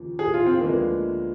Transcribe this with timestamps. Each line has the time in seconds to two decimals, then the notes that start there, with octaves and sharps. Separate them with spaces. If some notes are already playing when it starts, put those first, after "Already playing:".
Already playing: D#2 C#3 F3
0.19 G#4
0.34 F4
0.46 C4
0.61 D2 D3 F3 G#3 A#3 B3